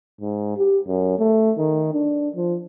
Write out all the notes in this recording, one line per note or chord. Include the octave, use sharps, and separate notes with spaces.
G#2
G4
F#2
A3
D#3
D4
F3